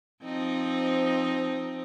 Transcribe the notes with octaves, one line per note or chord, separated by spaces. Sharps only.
F3 C4 D#4